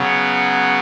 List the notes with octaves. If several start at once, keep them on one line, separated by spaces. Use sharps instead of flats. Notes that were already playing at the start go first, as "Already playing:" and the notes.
Already playing: C#3 F#3 B3